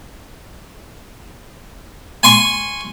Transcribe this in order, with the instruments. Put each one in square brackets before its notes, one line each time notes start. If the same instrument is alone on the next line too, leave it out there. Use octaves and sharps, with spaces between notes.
[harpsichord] G#5 C6 C#6